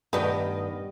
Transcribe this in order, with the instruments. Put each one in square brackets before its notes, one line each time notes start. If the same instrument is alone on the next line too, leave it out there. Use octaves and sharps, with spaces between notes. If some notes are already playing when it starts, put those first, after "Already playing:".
[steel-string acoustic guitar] G2 [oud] D#3 B3 G4 [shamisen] A3 B4 [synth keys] D#5